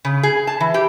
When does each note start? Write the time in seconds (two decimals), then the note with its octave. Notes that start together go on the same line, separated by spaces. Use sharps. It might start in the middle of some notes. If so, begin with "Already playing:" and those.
0.05 C#3
0.23 G#4
0.47 A5
0.60 E3
0.74 G4